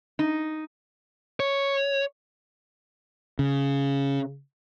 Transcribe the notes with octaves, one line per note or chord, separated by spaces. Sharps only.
D#4
C#5
C#3